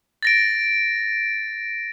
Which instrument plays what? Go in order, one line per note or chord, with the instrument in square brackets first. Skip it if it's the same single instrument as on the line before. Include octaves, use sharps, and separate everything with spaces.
[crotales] A6 A#6 D7